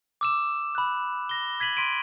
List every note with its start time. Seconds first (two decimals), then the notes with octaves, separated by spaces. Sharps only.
0.21 D6 E6 E7
0.75 B5 F#6
1.29 A#6 G7
1.60 G#6 B6 D#7 F#7
1.77 C6 B6 D7 D#7